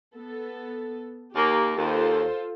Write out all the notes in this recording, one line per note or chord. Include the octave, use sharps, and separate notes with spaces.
B3 A4
D#2 A#3 G4
D#2 F4 A4 C5